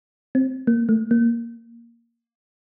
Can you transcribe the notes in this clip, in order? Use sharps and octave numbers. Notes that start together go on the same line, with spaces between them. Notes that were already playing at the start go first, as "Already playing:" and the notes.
C4
A#3
A3
A#3